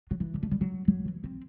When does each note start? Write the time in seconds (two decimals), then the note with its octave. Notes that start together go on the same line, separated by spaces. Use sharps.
0.11 F#3
0.20 E3
0.34 D3
0.43 A3
0.51 G3
0.61 F#3
0.88 F#3
1.05 E3
1.24 C4